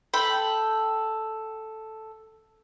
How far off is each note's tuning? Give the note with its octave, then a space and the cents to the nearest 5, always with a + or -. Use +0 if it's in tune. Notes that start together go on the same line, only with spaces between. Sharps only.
A4 +0 G5 -5 B5 +0